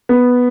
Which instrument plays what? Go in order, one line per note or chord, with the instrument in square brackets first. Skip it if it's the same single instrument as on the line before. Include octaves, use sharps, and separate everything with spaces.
[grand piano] B3